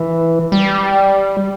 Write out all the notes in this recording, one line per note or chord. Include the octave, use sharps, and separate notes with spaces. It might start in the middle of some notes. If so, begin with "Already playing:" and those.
Already playing: E3
G3